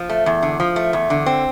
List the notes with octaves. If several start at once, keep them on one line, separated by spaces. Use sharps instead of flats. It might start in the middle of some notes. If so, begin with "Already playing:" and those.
Already playing: F3
A3
E2
D3
F3
A3
E2
D3
C4